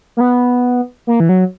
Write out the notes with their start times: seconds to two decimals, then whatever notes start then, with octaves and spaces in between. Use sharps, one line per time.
0.17 A#3
0.20 B3
1.07 A#3
1.20 E3
1.29 F#3